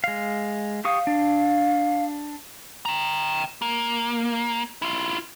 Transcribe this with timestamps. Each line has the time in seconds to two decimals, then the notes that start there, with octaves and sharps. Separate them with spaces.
0.04 G#3 F5
0.85 G4 F5 C#6 D#6
1.07 D4
2.85 G5 A#5
3.62 A#3
4.82 E4 F4